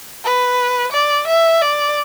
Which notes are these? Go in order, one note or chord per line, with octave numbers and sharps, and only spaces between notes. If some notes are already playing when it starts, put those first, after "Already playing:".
B4
D5
E5
D5